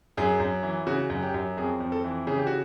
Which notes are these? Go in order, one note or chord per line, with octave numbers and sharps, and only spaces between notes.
F#2 G#4
F#2
E3
C#3 F#4
F#2
G4
F#2
F2 G#4
F2
A4
E3
C#3 G#4
G4
F#4